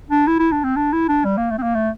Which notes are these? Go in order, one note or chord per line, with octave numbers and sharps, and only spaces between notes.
D4
E4
E4
D4
C4
D4
E4
D4
G3
A#3
A3
C4
A#3
A3